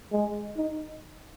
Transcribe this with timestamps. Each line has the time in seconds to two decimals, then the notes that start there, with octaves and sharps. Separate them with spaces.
0.12 G#3
0.57 D#4